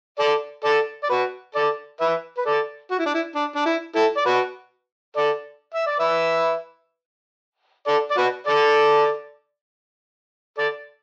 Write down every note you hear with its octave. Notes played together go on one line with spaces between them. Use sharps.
A4 D5
A4 D5
D5
F#4 B4
A4 D5
B4 E5
B4
A4 D5
F#4
E4
D4
E4
D4
D4
E4
E4 A4
D5
F#4 B4
A4 D5
E5
D5
B4 E5
A4 D5
D5
F#4 B4
A4 D5
A4 D5